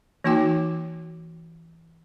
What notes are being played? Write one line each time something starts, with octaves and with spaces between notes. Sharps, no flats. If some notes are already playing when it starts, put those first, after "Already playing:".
E3 A#3 D#4 F#4 G5 D6